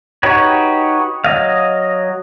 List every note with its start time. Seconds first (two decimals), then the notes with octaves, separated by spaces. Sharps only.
0.23 D#4 F#4 G4 B4 C#5
1.24 F#3 D#5 F5